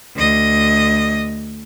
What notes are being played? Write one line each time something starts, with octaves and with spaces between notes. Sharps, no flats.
D2 D#5